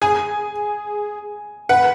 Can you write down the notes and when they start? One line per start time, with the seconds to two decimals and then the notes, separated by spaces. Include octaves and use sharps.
0.01 G#4 G#5
1.69 B4 F#5